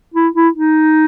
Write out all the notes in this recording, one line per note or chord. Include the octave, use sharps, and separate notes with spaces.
E4
E4
D#4